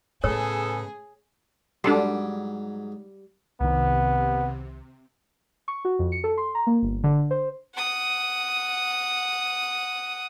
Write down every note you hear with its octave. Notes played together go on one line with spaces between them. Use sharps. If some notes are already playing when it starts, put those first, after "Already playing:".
A2 C#3 B3 G#4 A4 C#5
G#2 F#3 G3 D4 A4 C6
C2 C3 D#3 B3
C#6
F#4
F2
C#7
A4
C6
A#5
A#3
G1
D3
C5
F#5 D#6